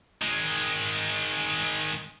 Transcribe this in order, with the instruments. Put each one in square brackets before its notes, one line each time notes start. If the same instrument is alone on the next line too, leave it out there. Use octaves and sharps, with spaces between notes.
[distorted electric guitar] D#3 G#3